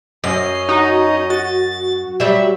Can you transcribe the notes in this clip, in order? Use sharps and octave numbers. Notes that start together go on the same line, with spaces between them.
F#2 C#4 D#5 C7
D#4 F#4
F#4 A6
F#3 G3 E5